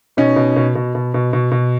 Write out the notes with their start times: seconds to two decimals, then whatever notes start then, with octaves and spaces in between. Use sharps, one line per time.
0.17 B2 C#4 D#4
0.36 B2
0.56 B2
0.75 B2
0.95 B2
1.14 B2
1.33 B2
1.51 B2